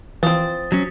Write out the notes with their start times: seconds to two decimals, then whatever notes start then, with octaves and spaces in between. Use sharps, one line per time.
0.23 E3 F3 C4 D#6 A6
0.72 F#3 C#4